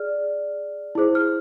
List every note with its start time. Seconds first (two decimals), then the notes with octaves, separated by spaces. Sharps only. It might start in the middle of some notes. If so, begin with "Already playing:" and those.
Already playing: G#4 D5 F6
0.95 E4 G#4 C5
1.15 F6